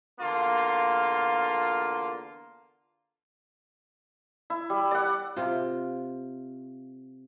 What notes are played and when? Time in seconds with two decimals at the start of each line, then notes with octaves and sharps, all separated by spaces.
0.20 E2 D3 A#3 F4
4.50 E4
4.70 G3
4.91 D5 F#5
5.36 C3 F4